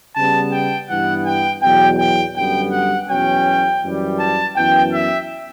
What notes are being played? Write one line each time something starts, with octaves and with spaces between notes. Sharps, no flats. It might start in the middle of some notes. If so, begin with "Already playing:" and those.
C#3 G3 B3 A5
G5
G2 E3 B3 F#5
G5
E2 B2 F#3 G5
G5
F#2 D3 G3 B3 G5
F#5
E2 B2 F#3 C#4 G5
F#2 E3 G3
A5
F#2 E3 B3 G5
E5